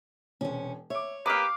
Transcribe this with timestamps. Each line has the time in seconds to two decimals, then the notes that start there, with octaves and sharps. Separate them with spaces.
0.41 E1 C3 C#4
0.90 C#5 E5 D6
1.26 A#3 G4 B4 F5 A#5 D6 D#6